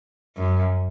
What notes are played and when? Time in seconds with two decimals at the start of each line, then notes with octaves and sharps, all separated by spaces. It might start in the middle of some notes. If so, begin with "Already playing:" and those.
0.36 F#2